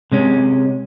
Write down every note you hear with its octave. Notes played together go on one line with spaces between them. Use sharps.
C3 G#3 C#4